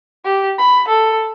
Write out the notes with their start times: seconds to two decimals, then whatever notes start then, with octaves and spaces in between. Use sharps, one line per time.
0.25 G4
0.58 B5
0.88 A4